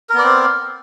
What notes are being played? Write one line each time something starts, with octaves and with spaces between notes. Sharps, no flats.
B3 C4 A#4 D5